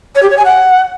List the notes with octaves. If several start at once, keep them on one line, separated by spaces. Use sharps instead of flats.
C#5
G4
C#5
G#5
F#5